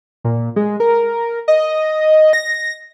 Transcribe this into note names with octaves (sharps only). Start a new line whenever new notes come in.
A#2
G#3
A#4
D#5
A#6